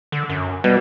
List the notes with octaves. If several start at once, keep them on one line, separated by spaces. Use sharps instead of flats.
D3
F#2
B2 G3